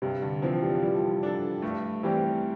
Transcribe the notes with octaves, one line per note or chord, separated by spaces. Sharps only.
G2 C3
D3
E3 F3 C4
G3
F3
E3 G3
F3
D4 A4
G2 A3
E3 G3 C4 G4